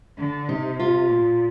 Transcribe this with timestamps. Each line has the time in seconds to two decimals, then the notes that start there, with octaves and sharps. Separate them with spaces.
0.18 D3
0.49 C3 D#4
0.79 F4
1.10 A#2